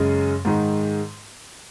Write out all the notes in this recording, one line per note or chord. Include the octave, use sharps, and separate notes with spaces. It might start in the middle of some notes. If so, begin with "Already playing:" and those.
Already playing: F#2 C#3 G#3
G#2 D#3 G#3